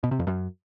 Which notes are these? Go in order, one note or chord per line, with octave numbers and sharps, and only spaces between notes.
B2
C3
F2
F#2